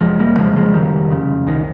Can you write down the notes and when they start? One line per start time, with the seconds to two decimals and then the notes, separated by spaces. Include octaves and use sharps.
0.01 F1 F3 G#3
0.19 G3 A#3
0.37 F2 C#3 F3 G#3
0.56 F3 G#3
0.74 F1 D#3 G3
1.10 F2 C#3
1.47 C2 D#3